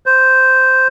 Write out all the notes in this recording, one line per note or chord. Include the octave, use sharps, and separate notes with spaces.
C5